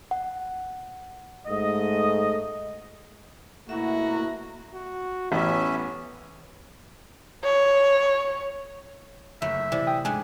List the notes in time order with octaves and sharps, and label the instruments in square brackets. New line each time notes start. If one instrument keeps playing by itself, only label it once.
[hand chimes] F#5
[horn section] G#2 A3 D#5
[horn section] B2 A3 F#4 [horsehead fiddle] A#3 A#5 [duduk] E4 [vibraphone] E5
[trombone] F#4
[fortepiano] A1 [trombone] B3 [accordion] C#4 E5
[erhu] C#5
[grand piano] F#1 [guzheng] A3 [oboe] E5
[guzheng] C3 [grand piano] E3 D5
[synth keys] G5 D#6
[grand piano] G#2 [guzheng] A3 D4 [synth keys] G#5